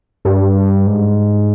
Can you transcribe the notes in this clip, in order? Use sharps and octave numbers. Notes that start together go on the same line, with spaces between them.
G2
G#2